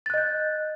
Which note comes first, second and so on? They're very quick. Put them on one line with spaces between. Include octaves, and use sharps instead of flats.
A6 F#6 D#5 G6